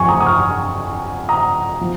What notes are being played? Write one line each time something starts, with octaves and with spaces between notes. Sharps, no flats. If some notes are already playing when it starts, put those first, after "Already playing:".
Already playing: F2 F3 G#5 C#6
A#5 D#6
D#6
C#6 F6
A#5 D#6
F3